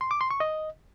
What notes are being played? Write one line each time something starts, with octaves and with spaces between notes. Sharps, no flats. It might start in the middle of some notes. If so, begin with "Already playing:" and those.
C6
D6
C6
C#6
D#5